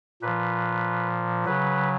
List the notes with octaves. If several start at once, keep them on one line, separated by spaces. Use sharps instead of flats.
A#2 F3 B4
C#3 F#3 B4